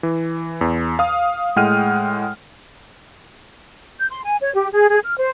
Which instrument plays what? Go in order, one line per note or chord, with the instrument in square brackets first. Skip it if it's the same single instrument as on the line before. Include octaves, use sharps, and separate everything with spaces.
[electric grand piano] E3
E2
F5 D#6
A2 G#3 F#5 G5 F6 D#7
[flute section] G6
C6
G#5
C#5
G4
G#4
G#4
F6
C5